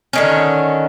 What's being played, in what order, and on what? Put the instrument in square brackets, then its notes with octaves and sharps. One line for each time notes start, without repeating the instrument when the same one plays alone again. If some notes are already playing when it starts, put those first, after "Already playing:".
[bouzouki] D3 D#3 C#4